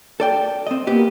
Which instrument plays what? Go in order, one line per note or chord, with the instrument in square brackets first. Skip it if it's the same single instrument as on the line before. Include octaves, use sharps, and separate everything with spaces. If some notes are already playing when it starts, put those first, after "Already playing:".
[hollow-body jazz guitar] A4 D5 G5
C4 D#5
[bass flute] A#3 [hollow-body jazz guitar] B3 G4